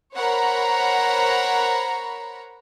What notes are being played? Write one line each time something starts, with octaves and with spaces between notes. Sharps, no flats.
A#4 C5 C#5 F#5 A#5 B5